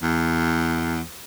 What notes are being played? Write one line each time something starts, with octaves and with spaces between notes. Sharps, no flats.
E2